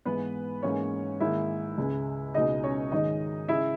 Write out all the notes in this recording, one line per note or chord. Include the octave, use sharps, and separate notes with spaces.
G#2 E3 G#3 B3 B4
G#2 E3 A#3 C#4 C#5
G#2 D#3 A#3 E4 E5
C#2 C#3 G#3
C#2 B2 G#3 D#4 D#5
C#4 C#5
G#2 D#3 G#3 D#4 D#5
C#3 G#3 E4 E5